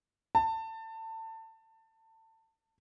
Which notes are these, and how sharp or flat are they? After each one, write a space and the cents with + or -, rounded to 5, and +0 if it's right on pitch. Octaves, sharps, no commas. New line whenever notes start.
A5 +25